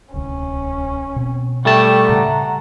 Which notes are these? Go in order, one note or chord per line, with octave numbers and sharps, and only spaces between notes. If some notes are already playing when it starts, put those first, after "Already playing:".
D1 C2 C#4
B2 C4
G3 A3 G5 A5 C#6
A2 C#3 F#5 A#5